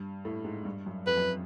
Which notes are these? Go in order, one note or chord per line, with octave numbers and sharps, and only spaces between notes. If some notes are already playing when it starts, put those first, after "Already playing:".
Already playing: G2
A2
G#2
G2
F#2
F2 B4
F#2